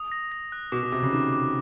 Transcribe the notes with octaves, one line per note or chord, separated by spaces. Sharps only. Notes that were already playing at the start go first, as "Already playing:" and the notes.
Already playing: D#6
A#6
A#6
F#6
B2 D6
B2
C3 D6
C#3
D#3 D6
D6